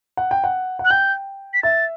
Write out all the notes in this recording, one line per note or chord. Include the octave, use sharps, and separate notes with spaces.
F#5
G5
F#5
F#5
F#6
G5 G6
B6
E5 A6